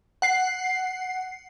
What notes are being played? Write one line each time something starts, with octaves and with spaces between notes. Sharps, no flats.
F#5 C7